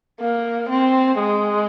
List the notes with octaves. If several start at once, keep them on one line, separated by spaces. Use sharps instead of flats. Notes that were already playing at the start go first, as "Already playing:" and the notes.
A#3
C4
G#3